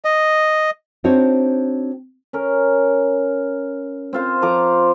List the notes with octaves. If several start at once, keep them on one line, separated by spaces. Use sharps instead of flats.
D#5
C4 D4 D#4 F#4 C5 C#5
C#4 A#4
C4 F4 C5
F3 C5 A#5 D6